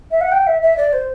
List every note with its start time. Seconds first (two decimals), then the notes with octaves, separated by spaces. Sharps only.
0.11 E5
0.21 F#5
0.32 G5
0.47 E5
0.62 E5
0.77 D5
0.93 C5